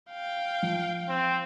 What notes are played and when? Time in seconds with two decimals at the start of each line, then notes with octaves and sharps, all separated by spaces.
0.10 F5 G5
0.62 F3
1.09 C4